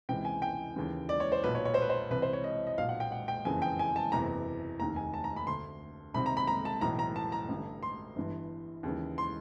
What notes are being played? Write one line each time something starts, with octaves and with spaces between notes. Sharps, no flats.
C#2 C3 E3 G5
G#5
G5
D#2 C#3 E3
D5
C#5
C5
B1 A#2 B4
C#5
C#5
C5
B4
C5
C2 C3 E3 B4
C5
C#5
D#5
D#5
B1 A#2 F5
F#5
G5
F#5
G5
F#1 F2 C#3 E3 G#5
G5
G#5
A5
F#1 E2 C3 E3 A#5
F1 D#2 D#3 A#5
G#5
A5
A#5
B5
D2 D3 C6
C2 C3 D#3 B5
A#5
B5
A#5
A5
B1 A2 E3 A#5
A#5
A5
A#5
A1 G2 D3
C6
G1 G2 E3
D#2 C#3 E3
C6